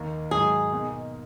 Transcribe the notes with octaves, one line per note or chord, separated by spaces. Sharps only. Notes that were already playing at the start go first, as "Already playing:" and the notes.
Already playing: D#2 D#3 A#3
G#2 D#3 F#3 G#4
B2 A#3 D#4